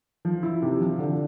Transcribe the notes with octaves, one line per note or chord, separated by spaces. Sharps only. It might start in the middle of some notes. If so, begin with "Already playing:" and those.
F3
E4
C3
F3
D3